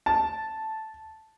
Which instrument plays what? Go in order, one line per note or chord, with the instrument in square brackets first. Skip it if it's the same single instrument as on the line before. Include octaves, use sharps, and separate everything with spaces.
[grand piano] A5